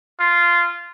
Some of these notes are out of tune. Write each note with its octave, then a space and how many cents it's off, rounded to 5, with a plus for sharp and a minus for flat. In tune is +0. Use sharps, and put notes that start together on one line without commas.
F4 -10